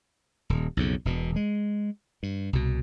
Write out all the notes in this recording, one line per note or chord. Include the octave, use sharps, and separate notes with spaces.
D#1
B1 F2 C#3
E1 B2
G#3
G2
C2 B2